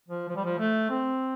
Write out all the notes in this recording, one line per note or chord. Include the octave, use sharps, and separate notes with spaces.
F3
F3
G3
F3
A3
C4